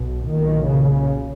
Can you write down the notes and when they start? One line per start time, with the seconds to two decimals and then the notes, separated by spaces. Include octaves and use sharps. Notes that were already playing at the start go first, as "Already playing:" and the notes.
Already playing: B1 B2
0.27 B1 A#2 D#3
0.67 C#3